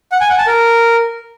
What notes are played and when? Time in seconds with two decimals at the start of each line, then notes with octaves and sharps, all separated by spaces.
0.12 F#5
0.21 G#5
0.29 F#5
0.38 A5
0.47 A#4